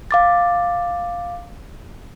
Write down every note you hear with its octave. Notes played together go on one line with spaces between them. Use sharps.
F5 D6 A6